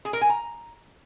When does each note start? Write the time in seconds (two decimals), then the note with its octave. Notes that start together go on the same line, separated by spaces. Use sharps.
0.05 G#4
0.13 A#4
0.21 G#5
0.30 A#5